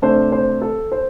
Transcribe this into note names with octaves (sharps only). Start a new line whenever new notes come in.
C3 A3 D4 C5
C5
A4
C5